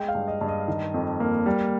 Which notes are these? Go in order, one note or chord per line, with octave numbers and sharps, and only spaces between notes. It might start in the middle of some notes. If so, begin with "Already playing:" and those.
Already playing: G#3 G5
F5
G2
D#5
G2
D#5
D#3
F2
A#3
G3